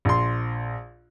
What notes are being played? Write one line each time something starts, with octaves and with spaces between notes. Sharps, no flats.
A#1 C6